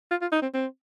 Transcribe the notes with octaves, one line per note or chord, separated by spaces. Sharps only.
F4
F4
D#4
C4
C4